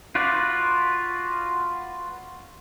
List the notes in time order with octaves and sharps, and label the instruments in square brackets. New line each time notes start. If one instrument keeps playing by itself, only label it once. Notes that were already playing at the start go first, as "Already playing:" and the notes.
[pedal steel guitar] F4 F#4 B4 D5